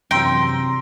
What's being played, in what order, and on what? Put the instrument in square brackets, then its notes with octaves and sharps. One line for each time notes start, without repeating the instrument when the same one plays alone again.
[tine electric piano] F#2 E3 F#3 [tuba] C3 [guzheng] G5 [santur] A#5 C6 E6